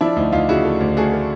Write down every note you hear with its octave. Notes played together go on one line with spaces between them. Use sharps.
F3 D4 E4
D2 D#4
D2 D#4 F4
C#3 E4 F#4
A3
D2
A3 F#4 G#4
A3